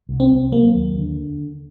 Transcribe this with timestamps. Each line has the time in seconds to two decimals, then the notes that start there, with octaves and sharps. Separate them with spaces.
0.09 C2
0.20 C4
0.31 C2
0.52 F#3 A#3
0.74 D#2
0.97 D3